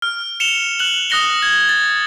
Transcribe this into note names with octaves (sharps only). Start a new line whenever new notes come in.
F6
C#7 E7 F7 G7
F#6 E7 F#7
D#6 F#6 A#6 C#7 G7
G#6
A6